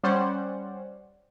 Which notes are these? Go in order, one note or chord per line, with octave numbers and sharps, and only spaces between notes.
G3 C#4 C5 D5 F#5